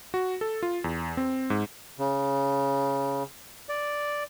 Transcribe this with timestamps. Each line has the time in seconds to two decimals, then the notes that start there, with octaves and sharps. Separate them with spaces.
0.14 F#4
0.41 A4
0.63 F4
0.84 E2
1.17 C4
1.50 G#2
1.99 C#3
3.69 D5